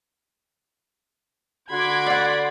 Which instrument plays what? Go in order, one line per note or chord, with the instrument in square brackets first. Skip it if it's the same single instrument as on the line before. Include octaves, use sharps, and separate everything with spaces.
[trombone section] D3 F#4 [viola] B5 C6 [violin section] D6 G#6
[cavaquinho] D5 F#5